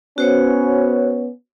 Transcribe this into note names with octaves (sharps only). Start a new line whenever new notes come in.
B3 C#4 F#4 C5 C#5